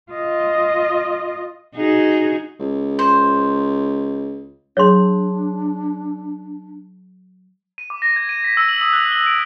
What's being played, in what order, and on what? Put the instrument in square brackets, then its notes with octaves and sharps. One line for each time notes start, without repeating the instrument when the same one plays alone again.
[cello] F4 D#5
[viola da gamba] D#4 F#4 G#4
[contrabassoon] C#2
[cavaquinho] C5
[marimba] F#3 G#4 [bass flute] D4 [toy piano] C#5 C6
[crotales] D#7
D6
A#6
G#6
D#7
B6
E6
F#7
D#6
F#6
G7
D7